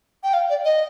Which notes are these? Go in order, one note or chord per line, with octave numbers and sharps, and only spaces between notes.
G5
F5
D5
D#5